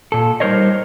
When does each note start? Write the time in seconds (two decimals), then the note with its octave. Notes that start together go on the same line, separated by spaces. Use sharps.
0.12 A#2 A4
0.40 G3 D#4 A#4 C5 C#5 D#5